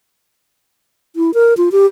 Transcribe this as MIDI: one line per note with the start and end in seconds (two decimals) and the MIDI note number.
1.16 1.34 64
1.34 1.54 70
1.57 1.69 65
1.72 1.86 67